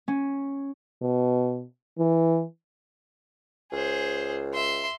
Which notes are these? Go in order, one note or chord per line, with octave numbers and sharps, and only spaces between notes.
C#4
B2
E3
C#2 G#4 C5
E5 C6